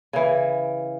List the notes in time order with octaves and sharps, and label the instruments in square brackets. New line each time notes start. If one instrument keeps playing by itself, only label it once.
[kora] C#3 E3